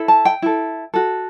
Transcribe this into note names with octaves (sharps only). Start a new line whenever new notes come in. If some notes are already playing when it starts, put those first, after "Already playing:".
Already playing: E4 A4
A5
G5
E4 A4
F#4 A4